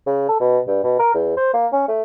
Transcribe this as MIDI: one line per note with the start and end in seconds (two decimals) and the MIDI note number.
0.07 0.24 49
0.29 0.38 69
0.40 0.59 47
0.67 0.81 43
0.84 0.99 47
0.99 1.10 70
1.14 1.34 40
1.37 1.52 72
1.54 1.67 58
1.73 1.83 61
1.88 2.03 57